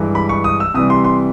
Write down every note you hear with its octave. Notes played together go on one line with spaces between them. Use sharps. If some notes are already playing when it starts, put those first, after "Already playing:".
Already playing: G2 E3 G#3
B5
C#6
D#6
E6
C3 E3 G3 D#6
C6
C6